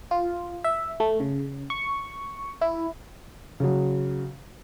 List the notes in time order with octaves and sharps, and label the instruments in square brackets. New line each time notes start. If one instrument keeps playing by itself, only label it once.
[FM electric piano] F4
E5
A3
C#3
C#6
E4
[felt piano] C#3 F#3